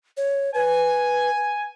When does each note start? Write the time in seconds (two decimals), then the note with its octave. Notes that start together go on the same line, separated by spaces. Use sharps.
0.17 C#5
0.54 B4 G#5